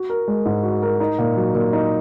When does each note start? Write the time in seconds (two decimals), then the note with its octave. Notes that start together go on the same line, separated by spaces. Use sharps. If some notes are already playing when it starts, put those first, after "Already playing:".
Already playing: F#4
0.10 A#4
0.28 G#3
0.46 G#2
0.63 F#4
0.82 A#4
1.00 D#4
1.19 A#2
1.37 F#3
1.55 A#2
1.73 D#4